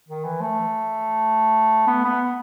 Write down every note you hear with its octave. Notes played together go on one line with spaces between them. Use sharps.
D#3
E3
A3
B3
B3